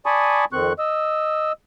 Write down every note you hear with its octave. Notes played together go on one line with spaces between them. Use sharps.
D5 G#5 A5 B5 C#6 D#6
F2 D#3 C4 C#6 F#6
D#5 E6